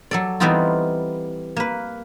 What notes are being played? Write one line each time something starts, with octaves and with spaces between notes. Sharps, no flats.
F#3 A4 D5
E3 G3 B3 C4 D#4 F4
A#3 B4